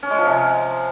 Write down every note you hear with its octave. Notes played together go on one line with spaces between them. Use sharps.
C#4
G#3
F3
C3